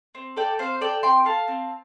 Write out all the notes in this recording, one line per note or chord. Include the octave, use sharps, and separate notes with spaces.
C4
A4 D5 G5
C4 C5 F5
A4 D5 G5
C4 G5 C6
A4 F5 A5
C4